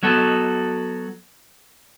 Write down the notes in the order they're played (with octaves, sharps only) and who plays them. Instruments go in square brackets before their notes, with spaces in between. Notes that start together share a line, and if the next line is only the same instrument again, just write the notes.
[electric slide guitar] F#3 B3 F#4 A4